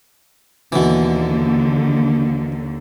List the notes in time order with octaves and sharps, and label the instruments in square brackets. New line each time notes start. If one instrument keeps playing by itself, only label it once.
[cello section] D#2 D3 [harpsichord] B2 E3